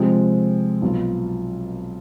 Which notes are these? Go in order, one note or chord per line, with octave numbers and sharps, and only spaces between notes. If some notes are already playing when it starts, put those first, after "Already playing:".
Already playing: C3 F3 G#3 C4
B1 B2 B3 F4